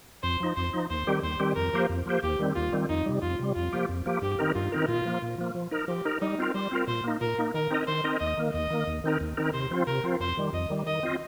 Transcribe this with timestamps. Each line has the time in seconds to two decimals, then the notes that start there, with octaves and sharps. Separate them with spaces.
0.23 F2 C5
0.40 F3 D#4
0.56 F2 C5
0.73 F3 D#4
0.90 D#2 C5
1.07 D#3 G3 C4 G4
1.23 D#2 C5
1.40 D#3 G3 C4 G4
1.56 F2 A#4
1.73 F3 A#3 G4 C5
1.89 F2
2.06 F3 A#3 G4 C5
2.23 D#2 G4
2.39 D#3 G3 C4
2.55 D#2 F4
2.73 D#3 G3 C4
2.89 F2 D#4
3.06 C3 G3
3.22 F2 F4
3.39 C3 G3
3.55 F2 F4
3.73 F3 A#3 G4
3.89 F2
4.06 F3 A#3 G4
4.22 G2 G4
4.39 D#3 C4 D#4 A#4
4.55 G2 F4
4.72 D#3 C4 D#4 A#4
4.88 A#2 F4
5.05 F3 A#3
5.22 A#2
5.38 F3 A#3
5.54 F3
5.71 D#4 A#4
5.88 F3 G4
6.05 D#4 A#4
6.22 G3 D#4
6.39 C4 F4 A#4
6.55 G3 C5
6.71 C4 F4 A#4
6.87 A#2 C5
7.04 A#3 D#4
7.21 A#2 A#4
7.38 A#3 D#4
7.54 D#3 A#4
7.71 C4 D#4 A#4 D#5
7.87 D#3 C5
8.04 C4 D#4 A#4 D#5
8.20 D#2 D#5
8.37 D#3 A#3
8.54 D#2 D#5
8.71 D#3 A#3
8.87 D#2
9.04 D#3 C4 D#4 A#4
9.20 D#2
9.37 D#3 C4 D#4 A#4
9.53 C3 C5
9.71 F3 C4 F4
9.87 C3 A#4
10.04 F3 C4 F4
10.20 F2 C5
10.37 D#3 G3
10.53 F2 D#5
10.70 D#3 G3
10.86 D#3 D#5
11.03 C4 F4 D#5